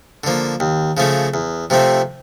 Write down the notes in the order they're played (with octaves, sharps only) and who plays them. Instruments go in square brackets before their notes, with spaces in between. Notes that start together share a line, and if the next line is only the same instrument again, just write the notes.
[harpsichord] D3 F3 A#3
D#2
C#3 F3 A3 C#4
E2
C3 F3 A3 C4